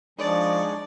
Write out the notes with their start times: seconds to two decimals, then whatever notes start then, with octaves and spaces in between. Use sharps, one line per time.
0.18 F3 G#3 D4 D#4 D5 C#6